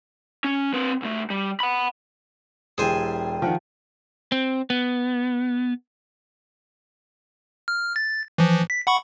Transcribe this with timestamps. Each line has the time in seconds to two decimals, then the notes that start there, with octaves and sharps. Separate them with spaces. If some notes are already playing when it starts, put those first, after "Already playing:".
0.44 C#4
0.73 C4 B4
1.02 C2 A3
1.30 G3
1.60 F#5 B5
2.78 E1 E4 G4 G#4 C5 D5 G#5
3.42 D#3 F3 F#5 G5
4.32 C4
4.70 B3
7.68 F6
7.96 A6
8.38 E3 F3
8.70 B6
8.87 F#5 B5 C#6